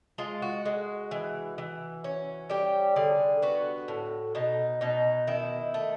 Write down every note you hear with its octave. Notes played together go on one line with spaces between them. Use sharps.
G#3 F4
F#4
G#3
E3
E3
C#4
G3 G4
D3 G#4
B3 F#4
A2
B2 D#4
B2 D#4
D#3 E4
A3